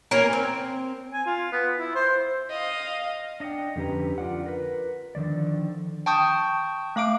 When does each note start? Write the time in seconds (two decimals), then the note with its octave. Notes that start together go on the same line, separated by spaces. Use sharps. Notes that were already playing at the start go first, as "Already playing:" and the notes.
0.11 E3 A#3 C#4 A#4
0.33 C4
1.13 G#5
1.26 F4
1.52 B3
1.78 E4
1.95 C5
2.50 D#5 F5
3.40 D4 D#5 E5 F#5 G5
3.76 F2 D3 C#4 G4 B4 A#5
4.18 F4 D5 F#5
4.46 A#4 B4
5.15 D3 D#3 F3 D5
6.06 G5 A5 C#6 D#6 G6
6.96 A3 F5 D6 D7